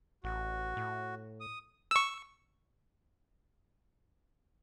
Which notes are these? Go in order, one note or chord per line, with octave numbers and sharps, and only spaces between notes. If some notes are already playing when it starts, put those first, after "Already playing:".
A1 F#4
A2
D#6
C#6 E6